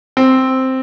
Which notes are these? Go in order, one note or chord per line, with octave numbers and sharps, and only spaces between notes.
C4